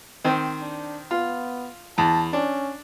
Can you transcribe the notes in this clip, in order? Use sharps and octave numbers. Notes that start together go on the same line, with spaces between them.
D#3 C4
D4
B3 F4
E2 A5
C#4 D4